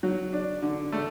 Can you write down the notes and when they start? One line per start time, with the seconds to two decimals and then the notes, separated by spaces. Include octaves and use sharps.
0.03 F#3
0.33 D4
0.62 D3
0.92 A3